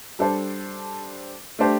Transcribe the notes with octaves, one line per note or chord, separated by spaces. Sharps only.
G3 D4 A4 C5
A3 D4 G4 C5